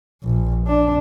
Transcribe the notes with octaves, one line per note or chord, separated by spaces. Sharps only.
A#1
D4